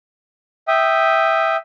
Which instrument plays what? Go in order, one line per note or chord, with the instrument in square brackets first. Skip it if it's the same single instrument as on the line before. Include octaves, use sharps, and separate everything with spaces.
[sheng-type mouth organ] E5 G5 D#6